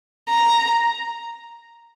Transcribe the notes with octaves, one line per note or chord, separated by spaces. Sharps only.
A#5